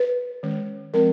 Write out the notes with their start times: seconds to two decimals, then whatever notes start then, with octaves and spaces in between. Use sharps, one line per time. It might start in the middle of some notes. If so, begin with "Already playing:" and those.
Already playing: B4
0.43 D#3 G#3 C#4
0.94 F3 G#3 C4 A#4